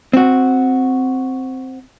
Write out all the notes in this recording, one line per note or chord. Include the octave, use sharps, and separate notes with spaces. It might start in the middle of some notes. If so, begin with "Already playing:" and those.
C4 F#4